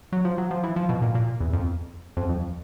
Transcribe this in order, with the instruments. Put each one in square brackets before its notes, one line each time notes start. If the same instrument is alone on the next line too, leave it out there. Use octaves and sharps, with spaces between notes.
[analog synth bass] F#3
F3
F#3
F3
E3
F3
B2
A#2
A#2
E2
F2
F2
F2